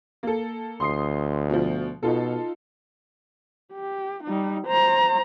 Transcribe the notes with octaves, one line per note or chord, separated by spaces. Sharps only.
A#3 A4
D2 C6 D#6 C7
B2 F3
B2 D#4 F4 A4
G4
G3 D#4
C5 A#5